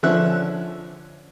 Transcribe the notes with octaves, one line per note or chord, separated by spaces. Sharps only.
D3 F3 C#4 E5 F#6